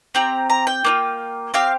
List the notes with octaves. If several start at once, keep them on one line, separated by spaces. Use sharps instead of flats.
C4 G4 A#5
A#5
G5
A#3 D4 F4
C4 G4 F5